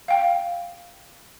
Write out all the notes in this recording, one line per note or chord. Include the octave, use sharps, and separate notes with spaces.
F5 G5